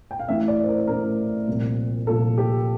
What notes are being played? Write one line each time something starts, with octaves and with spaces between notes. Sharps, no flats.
G5
F5
A1 A2 E3 E5
D5
C5
A#4
A1 A2 E3 A#4
C2 A#2 F3
C2 A#2 F3 A4
G4